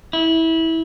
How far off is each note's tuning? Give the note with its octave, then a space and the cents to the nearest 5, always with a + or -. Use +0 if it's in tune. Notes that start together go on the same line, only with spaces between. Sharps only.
E4 -20